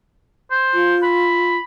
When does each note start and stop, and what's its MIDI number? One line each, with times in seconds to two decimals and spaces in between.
0.51 0.98 72
0.74 1.57 65
1.03 1.64 83